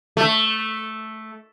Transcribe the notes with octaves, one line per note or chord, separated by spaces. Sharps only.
A3